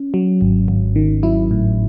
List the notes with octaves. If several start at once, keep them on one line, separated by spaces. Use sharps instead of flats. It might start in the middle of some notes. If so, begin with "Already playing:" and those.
Already playing: C#4
F#3
G#1
G#1
D#3
F#3 E4
A2